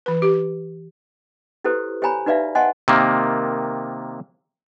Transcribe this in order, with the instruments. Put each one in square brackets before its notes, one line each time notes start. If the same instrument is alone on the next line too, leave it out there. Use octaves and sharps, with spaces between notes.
[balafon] E3 B4
G4
[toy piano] E4 F#4 G4 A4 B4 C5
G4 C5 C#5 G#5 A#5 B5
D#4 F#4 B4 D5 E5 F5
C5 D#5 F#5 G#5 A5 C6
[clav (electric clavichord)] C3 D#3 A#3